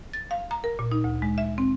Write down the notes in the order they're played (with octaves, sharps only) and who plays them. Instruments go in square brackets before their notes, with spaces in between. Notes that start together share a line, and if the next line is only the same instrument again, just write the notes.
[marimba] A6
F5
A#5
A#4
A#2
D#4
D2
G#3
E5
C4